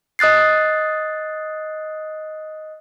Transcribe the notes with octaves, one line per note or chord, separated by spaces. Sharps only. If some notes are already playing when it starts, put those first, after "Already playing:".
D#5 D#6 F#6 A6 C7